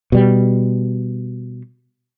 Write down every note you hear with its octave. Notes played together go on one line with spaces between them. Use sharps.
B2 G3